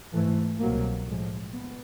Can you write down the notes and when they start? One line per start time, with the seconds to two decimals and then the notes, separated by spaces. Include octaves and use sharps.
0.13 G#2 E3 A3
0.59 C2 B2 F#3 A#3
1.06 A2 F3 G#3
1.53 B3